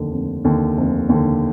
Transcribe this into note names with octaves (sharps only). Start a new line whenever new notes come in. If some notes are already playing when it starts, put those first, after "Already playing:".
Already playing: F1 D#2 D3
F1
D#2 D3
F1
D#2 D3